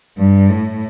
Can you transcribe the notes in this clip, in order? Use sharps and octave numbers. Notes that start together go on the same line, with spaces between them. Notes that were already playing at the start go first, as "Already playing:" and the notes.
G2
A2